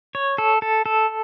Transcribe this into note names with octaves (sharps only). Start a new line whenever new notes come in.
C#5
A4
A4
A4